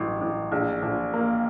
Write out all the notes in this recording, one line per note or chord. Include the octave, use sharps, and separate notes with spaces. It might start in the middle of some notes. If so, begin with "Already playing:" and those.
Already playing: A1 G2 F#3
A1
A#1
A#1
A#3